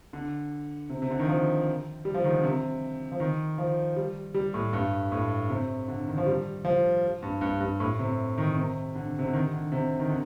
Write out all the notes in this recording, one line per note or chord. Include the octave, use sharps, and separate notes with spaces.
D3
C3
C3
D3
D#3
F3
G3
F3
D#3
D3
C3
F3
D#3
F3
G3
G3
A2
G2
A2
C3
D3
D#3
F3
G3
F3
G2
G2
G2
A2
C3
D#3
C3
D3
C3
D3
D#3
D3
C3
D#3
D3